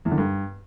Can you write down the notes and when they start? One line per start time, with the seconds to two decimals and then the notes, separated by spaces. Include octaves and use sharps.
0.05 E2
0.11 D3
0.18 G2